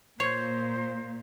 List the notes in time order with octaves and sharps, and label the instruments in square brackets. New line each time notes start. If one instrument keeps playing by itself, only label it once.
[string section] A#2 [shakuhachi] C5 [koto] C#5 [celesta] G#6 C7